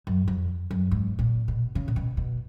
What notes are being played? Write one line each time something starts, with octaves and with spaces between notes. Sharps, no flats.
F#2
F2
F#2
G#2
A#2
B2
C#3
A#2
B2
B2